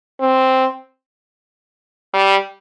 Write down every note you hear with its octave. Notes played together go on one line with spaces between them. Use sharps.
C4
G3